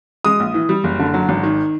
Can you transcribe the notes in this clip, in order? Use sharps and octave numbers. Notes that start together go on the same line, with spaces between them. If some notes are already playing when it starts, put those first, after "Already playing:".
G#3 D#6
A#1
E3
G3
F#1
D3
F#3
G#1
D#3